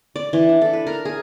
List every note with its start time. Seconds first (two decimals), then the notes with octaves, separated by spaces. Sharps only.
0.16 D5
0.33 E3
0.49 D4
0.62 A4
0.73 B4
0.87 A#4
1.05 G#4